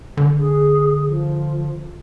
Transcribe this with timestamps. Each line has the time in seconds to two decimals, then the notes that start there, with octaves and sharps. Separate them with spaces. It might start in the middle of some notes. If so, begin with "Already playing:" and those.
0.17 D3
0.39 G#4
1.06 F3